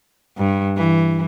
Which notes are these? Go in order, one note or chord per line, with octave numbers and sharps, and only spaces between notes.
G2
E3